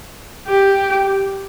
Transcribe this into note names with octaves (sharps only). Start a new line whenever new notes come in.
G4